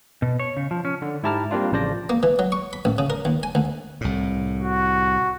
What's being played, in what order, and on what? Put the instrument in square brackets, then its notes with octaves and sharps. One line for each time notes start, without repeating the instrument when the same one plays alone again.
[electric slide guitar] B2
C#5
C#3
F3
C#4
[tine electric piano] D3
G#2 E4 G4 A5 A#5 F6
G3 A#3 C4 D4 F4
A1 C#3 F3 C5 D5 A#6
[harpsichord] A#3
E3
F#3
C#6
B5
A1
C#3
A#4
D#2
G#5
D2
[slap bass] C2 A2
[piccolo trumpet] F#4